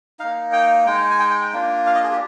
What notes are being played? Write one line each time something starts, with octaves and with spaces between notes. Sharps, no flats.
A#3 D#4 F5
G5
G#3 D#4 G5
G#5
G5
G5
G5
A#3 D4 F4
F5
D#5
G#4
G4